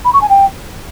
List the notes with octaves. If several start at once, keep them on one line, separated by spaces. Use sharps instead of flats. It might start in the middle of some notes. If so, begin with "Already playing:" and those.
B5
C#6
G#5
G5